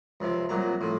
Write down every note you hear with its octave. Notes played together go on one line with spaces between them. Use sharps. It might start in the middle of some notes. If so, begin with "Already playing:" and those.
C#2 C3 F3
C2 A#2 F#3 A#5
A2 F3